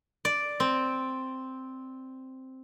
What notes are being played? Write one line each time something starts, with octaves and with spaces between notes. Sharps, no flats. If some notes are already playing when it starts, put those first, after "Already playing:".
D5
C4